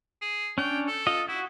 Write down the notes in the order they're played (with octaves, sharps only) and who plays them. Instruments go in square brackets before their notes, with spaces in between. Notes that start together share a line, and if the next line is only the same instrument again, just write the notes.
[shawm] G#4
[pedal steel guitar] C#4 D4 C#5 [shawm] G5
[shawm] A4
[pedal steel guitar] F4 D#5
[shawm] E4 [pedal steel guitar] F#4